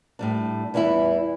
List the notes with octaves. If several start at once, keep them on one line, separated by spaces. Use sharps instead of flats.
A2 G3 D4
E2 E3 G3 B3 E4